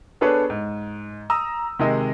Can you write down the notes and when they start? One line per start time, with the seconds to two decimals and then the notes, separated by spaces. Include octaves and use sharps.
0.21 B3 D4 G#4 A4 B4 C#5
0.50 G#2
1.30 A#5 D#6 E6
1.79 C3 D#3 G#3 G#4 D#5